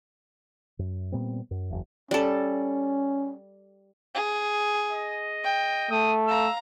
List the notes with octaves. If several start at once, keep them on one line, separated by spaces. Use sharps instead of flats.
F#2
A#2 G3 B3 C4
F#2
F#1 E2
G3 C#4 A4
G#4
D#5
G5
A3 D#6
F5 A#5 E6